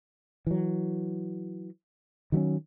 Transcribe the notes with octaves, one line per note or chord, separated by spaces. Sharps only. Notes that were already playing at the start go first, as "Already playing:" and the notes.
E3 F#3
D#3 F#3 B3 C#4